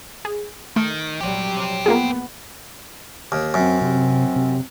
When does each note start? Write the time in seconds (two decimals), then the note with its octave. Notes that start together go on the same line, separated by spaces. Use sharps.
0.25 G#4
0.76 D#3 A3
1.21 A#1 F#3 G3 C4 G4
1.86 A#3 B3 F4 G#4
3.32 D#2
3.54 F#2 C4
3.82 C3 C4
4.36 C3